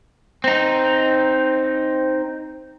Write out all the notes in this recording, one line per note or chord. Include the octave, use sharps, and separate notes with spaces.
C4 D#4